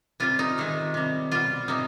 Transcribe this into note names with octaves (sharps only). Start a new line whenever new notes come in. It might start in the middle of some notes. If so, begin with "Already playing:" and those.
C3 G3 F4
D#4
C3 D#3 G#3
C3 G3
B2 G3 F4
C3 G3 D#4